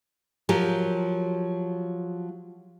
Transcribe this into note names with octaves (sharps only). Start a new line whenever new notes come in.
F3 F#3 G4 A#4